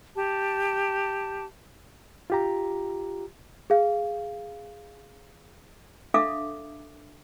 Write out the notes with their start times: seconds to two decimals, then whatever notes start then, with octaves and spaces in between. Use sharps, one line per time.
0.15 G4 A5
2.30 F4 G4 A#5
3.70 G#4 F5
6.14 D4 A4 E5 F5 D6 D#6